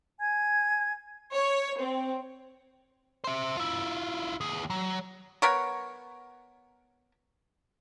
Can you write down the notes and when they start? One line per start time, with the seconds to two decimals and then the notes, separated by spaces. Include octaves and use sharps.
0.21 G#5 G#6
1.33 C#5
1.81 C4
3.24 C5 E5
3.57 E4 F4
4.41 D#2 G#4
4.70 F#3
5.42 B3 A#4 C#5